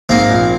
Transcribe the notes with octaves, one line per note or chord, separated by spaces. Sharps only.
G#2 A#3 C4
A#1